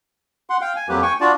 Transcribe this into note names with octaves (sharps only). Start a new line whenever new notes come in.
F#5 C6
F5 G5
G#5
F2 F#3 A#3 G4 B4
G5 G#5 C#6
D4 F4 F#4 D5 A5